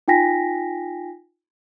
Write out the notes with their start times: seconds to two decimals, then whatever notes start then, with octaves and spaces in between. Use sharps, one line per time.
0.08 D#4 F4 G5 G#5 A#6 B6